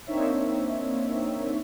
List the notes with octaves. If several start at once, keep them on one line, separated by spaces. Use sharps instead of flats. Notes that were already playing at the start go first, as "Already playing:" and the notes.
A#3 C4 D4 D#4 C#5 E5